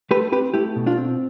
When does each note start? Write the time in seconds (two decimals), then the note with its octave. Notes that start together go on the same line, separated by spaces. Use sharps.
0.11 A3 G4 B4
0.32 C4 G4 B4
0.54 A3 E4 G4
0.76 B2
0.86 D4 F4
0.97 C4